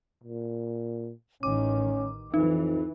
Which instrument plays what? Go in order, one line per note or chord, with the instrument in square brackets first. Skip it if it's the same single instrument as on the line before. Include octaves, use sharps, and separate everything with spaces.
[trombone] A#2
[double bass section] A1 D#3 [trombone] C#4 [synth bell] D6
[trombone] F2 [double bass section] E3 [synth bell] D#4